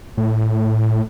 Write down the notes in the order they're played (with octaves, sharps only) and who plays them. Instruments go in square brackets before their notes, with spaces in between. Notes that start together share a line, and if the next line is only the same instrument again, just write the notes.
[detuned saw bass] A2